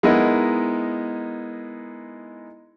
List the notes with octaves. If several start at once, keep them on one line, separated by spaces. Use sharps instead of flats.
G#3 B3 D#4 E4 A#4 D#5